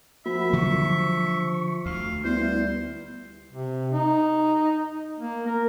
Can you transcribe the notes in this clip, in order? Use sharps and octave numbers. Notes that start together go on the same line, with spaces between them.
F3 A#3 F#4 E5 B5
D3 F#3 G3 C#6
D2 F5
G3 B3 E4 C5
C3
D#4
A#3
A#4